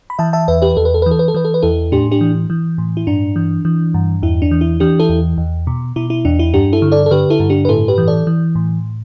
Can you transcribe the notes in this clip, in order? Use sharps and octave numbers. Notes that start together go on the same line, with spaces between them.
B5
E3 E5 A5
E5 A5
E2 B4 E5
G4 B4
E2 A4
B4
A4
B4
E3
A4
B4
A4
E3 B4
A4
B4
E2 E4 A4
A2 D4 G4
D4 G4
E3
E3
A2
E4
G2 D4
E3
E3
G2
E2 E4
D4
E3
E4
E3 D4 G4
E4 A4
E2
E2
B2
B2 E4
E4
E2 D4
E4
G2 D4 G4
E4 A4
D3
A4 D5
A4
D3 G4 B4
E4 A4
G2
D4 G4
B4
A2 E4 A4
G4 B4
E3
A4 D5
E3
A2